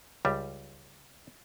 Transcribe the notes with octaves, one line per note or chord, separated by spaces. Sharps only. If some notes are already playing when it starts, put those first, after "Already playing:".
C#2 G3